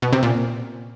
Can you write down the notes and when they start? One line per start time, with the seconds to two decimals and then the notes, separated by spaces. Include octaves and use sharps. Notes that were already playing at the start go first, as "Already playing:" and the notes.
0.02 B2
0.13 C3
0.23 A#2